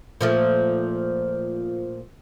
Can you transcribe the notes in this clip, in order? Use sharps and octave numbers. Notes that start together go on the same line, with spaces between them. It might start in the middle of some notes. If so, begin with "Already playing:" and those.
A#2 F3 A3